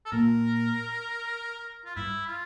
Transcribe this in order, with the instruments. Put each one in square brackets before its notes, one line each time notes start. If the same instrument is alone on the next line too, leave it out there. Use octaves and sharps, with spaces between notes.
[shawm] A4
[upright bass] A#2 [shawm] A#4
[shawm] F4
[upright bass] G2 [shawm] E4
[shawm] F4